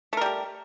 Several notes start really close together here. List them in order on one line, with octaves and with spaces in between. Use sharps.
A3 A#4 G3 G4